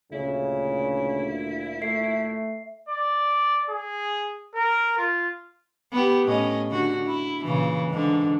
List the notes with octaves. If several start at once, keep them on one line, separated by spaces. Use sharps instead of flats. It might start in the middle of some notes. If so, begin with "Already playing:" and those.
D2 A#2 C#3 E4
A3 E5 C7
D5
G#4
A#4
F4
B3 G4
A2 C#4 D#5
D3 F#4
E4
A#2 C#3 E3
G#2 D3